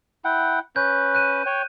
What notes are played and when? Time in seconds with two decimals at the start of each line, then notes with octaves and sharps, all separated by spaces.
0.25 E4 F#5 G5
0.76 C#4 B4 G6
1.15 F#6 D#7
1.46 C#5 G5